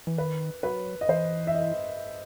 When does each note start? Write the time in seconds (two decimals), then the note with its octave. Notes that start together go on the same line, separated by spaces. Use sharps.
0.07 E3
0.18 D#3 B4
0.63 F#3 B4
1.01 D#5
1.09 E3 C5
1.47 E5
1.54 D#5